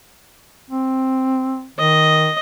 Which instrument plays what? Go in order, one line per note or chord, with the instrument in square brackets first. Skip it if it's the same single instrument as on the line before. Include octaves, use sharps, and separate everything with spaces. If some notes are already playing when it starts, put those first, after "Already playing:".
[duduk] C4
[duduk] D#3 [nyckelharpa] D#5